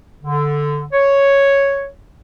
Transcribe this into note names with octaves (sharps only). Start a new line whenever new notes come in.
D3
C#5